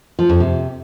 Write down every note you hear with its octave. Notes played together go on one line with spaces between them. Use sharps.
F3
F2
C3